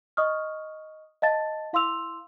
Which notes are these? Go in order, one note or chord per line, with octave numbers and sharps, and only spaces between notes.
D#5 C#6 D#6 F6
D#5 F5 A5 A6
E4 F5 C6 D6 E6 F7